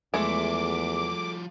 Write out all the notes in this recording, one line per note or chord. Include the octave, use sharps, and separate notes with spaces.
E2 F3 G#3 A3 F#4 D6